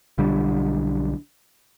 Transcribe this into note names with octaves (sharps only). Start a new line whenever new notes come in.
B1 D3 G3